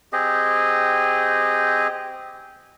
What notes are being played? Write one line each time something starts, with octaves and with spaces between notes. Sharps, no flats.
C4 G4 G#4 D#5